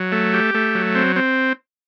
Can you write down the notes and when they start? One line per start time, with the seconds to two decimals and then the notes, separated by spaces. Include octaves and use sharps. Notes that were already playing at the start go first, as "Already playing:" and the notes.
Already playing: F#3
0.12 A3
0.34 G4
0.55 A3
0.75 F#3
0.95 C4
1.16 C4